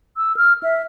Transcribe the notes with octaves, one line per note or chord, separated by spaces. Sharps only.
E6
F6
E5